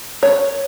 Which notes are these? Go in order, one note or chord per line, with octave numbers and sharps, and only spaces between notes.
C#5